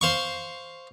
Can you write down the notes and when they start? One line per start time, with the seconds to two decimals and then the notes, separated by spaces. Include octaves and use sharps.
0.01 C5 F5 C#6